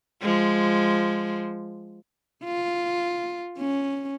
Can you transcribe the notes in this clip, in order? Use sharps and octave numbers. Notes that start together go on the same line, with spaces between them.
F3 G#3
F4
C#4